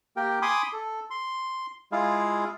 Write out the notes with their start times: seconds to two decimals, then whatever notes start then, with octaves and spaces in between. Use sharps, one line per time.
0.16 A#3 G4 A#4 G5
0.42 G#5 B5 C6 D6 D#6
0.73 A4
1.10 C6
1.92 G#3 E4 F4 G#4 F5